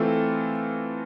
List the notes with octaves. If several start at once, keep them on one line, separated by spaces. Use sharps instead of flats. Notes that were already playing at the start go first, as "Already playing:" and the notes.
Already playing: E3 A3 C4 F4 A4